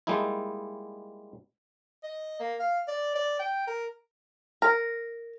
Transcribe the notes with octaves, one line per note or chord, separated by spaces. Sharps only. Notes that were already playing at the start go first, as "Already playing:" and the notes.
G3 G#3 A#3 D#4 E4
D#5
A#3
F5
D5
D5
G5
A#4
A#4